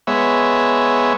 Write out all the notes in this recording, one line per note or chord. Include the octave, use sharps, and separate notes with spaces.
G#3 B3 C#5 E5